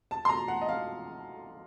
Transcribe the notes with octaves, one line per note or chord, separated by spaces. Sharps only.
A5
C6
A#5
F#5
D#5
F5